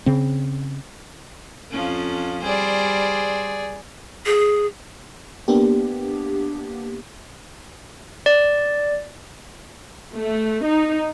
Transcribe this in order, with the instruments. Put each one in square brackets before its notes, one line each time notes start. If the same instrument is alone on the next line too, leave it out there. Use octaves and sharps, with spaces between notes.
[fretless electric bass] C#3 C4
[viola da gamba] F2 F3 C#4
[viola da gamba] G3 C5 [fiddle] G#4 D5
[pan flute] G#4
[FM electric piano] A#3 B3 D4 G4
[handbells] D5
[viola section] A3
D#4